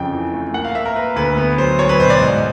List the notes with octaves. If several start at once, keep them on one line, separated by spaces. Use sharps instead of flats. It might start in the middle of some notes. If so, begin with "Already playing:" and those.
Already playing: F2 C#3 G5
E3
A3
A#3 F#5
F5
A#3 E5
A#4
A#3 B4
D2 B4
B3 B4
F#3 C5
F#3 C#5
B4
B2 C5
D5
G#2